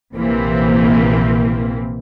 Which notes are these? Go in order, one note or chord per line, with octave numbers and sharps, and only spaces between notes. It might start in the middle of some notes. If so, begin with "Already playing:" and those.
A#1 C3 E3 A#3 C4